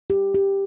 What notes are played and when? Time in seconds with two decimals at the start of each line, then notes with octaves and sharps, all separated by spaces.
0.10 G4
0.34 G4